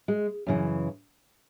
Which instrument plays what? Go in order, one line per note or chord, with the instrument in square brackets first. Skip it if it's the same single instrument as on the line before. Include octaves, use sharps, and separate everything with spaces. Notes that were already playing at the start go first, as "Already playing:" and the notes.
[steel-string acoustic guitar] G#3
F#2 C#3 E3